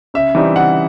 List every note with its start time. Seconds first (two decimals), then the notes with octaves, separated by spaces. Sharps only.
0.14 C#3 E5
0.35 E3 G3 C4 D#4
0.56 C#3 F#5